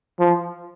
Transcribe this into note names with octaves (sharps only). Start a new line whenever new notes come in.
F3